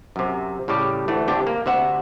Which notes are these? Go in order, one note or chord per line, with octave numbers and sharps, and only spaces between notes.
F#2 C3
A2 C#3 G3 G4
D2 E3 A3
G1 C3 D4 G4 G5
A#3
D2 C3 E5 F#5